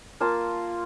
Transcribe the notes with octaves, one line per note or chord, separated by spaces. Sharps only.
A#3 F4 A5 A#5